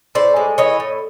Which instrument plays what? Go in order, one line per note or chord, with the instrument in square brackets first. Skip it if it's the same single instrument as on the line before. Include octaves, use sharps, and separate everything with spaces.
[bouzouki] A2 C5 D5
G#3
E3 C#5 D#5
A2